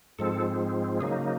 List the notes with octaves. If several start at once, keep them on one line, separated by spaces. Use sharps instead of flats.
G#2 F3 G#3 C4 A4
C#3 F#3 A#3 D#4 G#4